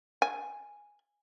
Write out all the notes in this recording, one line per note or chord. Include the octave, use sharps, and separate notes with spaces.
G#5